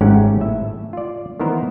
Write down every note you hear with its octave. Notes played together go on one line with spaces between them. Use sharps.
G#1 G#2 A3 C#4 G4 F#5
A2 E5
F4 D5
D#3 E3 B3 A#4 C5